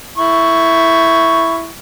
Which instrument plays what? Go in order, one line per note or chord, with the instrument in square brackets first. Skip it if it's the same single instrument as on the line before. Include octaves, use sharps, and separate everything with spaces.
[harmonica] E4 C#6